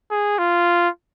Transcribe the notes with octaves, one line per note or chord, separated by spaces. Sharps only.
G#4
F4